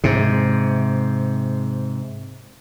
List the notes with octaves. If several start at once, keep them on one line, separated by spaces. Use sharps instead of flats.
G#2 C3